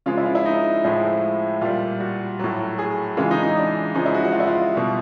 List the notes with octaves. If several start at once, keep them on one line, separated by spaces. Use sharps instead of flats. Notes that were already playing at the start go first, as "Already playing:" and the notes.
C#3 F3 G#3 F4
E4
F4
E4
D#4
A2 F3 G#3 E4
A#2 G3 F4
F#4
A2 F#3
G#4
C#3 E3 G#3 F4
D#4
D#4
D4
C#3 F3 G#3 D#4
E4
F#4
F#4
F4
E4
F4
B2 G3